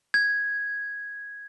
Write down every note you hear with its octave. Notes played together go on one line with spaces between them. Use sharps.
G#6